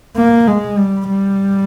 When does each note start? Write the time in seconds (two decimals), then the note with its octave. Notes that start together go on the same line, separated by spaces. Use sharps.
0.17 A#3
0.48 G#3
0.78 G3
1.10 G3